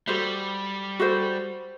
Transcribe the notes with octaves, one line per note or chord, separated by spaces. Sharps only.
G3 F#4 A4 C5
F#4 A4 C5